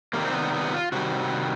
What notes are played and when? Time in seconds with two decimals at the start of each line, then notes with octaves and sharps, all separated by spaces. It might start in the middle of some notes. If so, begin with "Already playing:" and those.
0.13 C3 D#3 G3 A#3
0.25 C4
0.33 B3
0.53 B3
0.73 F4
0.92 C3 D#3 G3 F#4